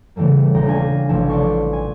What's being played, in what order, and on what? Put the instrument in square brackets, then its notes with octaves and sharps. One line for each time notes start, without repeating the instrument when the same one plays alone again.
[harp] C#3 E3 G3 A3 A#3
D#1 G5 A#5
C#4 D4 F5 G#5
A1 C3 F3 A4 G#5 A5
D5 A5 C6 C#6
G#5